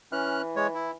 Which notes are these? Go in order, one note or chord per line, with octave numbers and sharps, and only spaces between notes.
E3 C#4 F6 F#6
G#3 C#5
E4